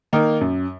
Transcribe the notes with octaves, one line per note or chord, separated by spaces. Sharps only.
D#3 A#3 D#4 A#4
F#2